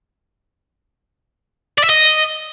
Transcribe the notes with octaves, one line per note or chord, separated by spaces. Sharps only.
D5
E5
D#5